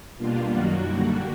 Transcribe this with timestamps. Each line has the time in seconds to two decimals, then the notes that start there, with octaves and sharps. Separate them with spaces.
0.17 B2 G3 A#3 D4 F4
0.49 F#2 D#3 F#3 F#4
0.82 D3 G3 A#3